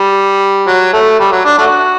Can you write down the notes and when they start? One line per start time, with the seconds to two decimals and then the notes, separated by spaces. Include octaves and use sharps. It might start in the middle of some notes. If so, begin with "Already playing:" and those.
Already playing: G3
0.67 F#3
0.93 A3
1.19 G3
1.32 F#3
1.45 D4
1.58 A3 D4 F#4